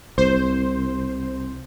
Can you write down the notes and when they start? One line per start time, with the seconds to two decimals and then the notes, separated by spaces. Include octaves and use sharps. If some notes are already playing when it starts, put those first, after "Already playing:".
0.18 C2 C5